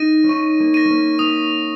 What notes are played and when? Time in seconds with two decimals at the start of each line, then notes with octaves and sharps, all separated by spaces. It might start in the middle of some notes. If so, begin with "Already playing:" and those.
Already playing: D#4 A#6 D#7
0.24 C#4
0.29 D#4 C#6
0.60 A#3
0.74 A#6 D#7
0.85 A#3 C#4
1.19 C#4 D#6